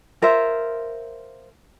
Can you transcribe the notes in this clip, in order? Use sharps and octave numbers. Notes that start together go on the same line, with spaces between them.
F4 A#4 C5 E5